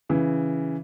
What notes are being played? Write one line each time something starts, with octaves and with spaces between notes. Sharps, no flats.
C#3 E3